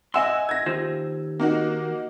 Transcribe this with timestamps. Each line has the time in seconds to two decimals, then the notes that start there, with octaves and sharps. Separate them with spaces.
0.14 D#5 E5 F#5 G#5 C6 E6
0.49 G#6 A#6
0.66 D#2 F4 C5
1.40 A#3 D#4 F#4